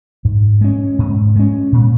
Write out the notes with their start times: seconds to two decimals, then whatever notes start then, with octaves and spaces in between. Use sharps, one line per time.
0.25 G#2
0.61 G#3 C#4
0.99 G#2
1.36 G#3 C#4
1.72 A#2